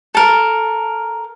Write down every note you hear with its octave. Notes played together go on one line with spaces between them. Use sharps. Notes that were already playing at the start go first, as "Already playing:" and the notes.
A4 A#4